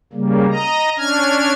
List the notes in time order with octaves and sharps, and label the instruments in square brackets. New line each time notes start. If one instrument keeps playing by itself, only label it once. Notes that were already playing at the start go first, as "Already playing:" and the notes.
[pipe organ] C#3 G3 A#3
D#5 A#5
C#4 D4 F6 G#6